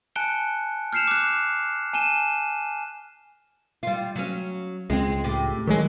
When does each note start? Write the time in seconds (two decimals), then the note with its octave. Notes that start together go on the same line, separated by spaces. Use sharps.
0.16 G#5 A5 F#6 C#7 D7 G7
0.93 F6 G6 C7 C#7 E7 F7
1.08 D6 F#6
1.93 G#5 A5 D#7 E7 G7
3.83 G3 F4
4.16 F#3 C#4
4.90 C#2 G#3 C4
5.24 A2 G4
5.67 D#3 F#3 G#3